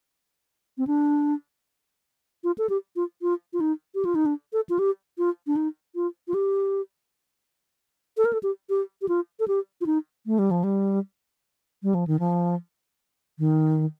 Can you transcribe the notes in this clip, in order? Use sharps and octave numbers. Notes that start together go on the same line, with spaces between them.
C4
D4
F4
A4
G4
F4
F4
F4
D#4
G4
F4
D#4
D4
A4
F4
G4
F4
D4
D#4
F4
F4
G4
A4
A#4
A4
G4
G4
G4
F4
A4
G4
F4
D#4
A3
G3
F3
G3
G3
F3
D#3
F3
D#3